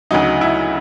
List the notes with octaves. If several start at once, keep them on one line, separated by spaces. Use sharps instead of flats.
D2 C#3 F#3 D#4
E4